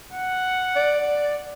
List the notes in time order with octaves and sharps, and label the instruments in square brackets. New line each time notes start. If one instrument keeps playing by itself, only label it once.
[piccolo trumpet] F#5
[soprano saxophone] D5